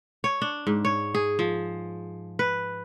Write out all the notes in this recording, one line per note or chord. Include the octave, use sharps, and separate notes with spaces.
C#5
D4
G#2
C#5
G#4
F3
B4